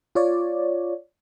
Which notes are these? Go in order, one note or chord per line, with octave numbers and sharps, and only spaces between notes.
F4 C#5 D5